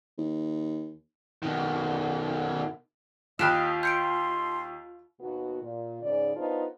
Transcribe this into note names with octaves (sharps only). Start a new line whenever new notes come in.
D#2
B2 D#3
D#2 F4 G4 D#5 B5 F6 F#6 E7
C6 G6 C#7 D7
D#2 B2 D#3 B3 F#4
A#2
G#2 C#3 D5
B3 D4 D#4 F4 A#4 C5